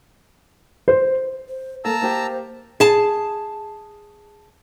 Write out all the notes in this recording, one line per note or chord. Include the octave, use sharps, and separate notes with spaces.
C5
C5
A#3 A4 A5 A#5 E6
A#3 G4 C5
G#4 A5